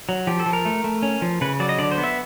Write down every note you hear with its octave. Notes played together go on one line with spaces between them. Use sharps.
F#3
F3 G4
A4
F3
A#4
A3
A3
C#4
F3
C#3 B4
F#3 D5
D#5
D3 D5
C5
B3
E5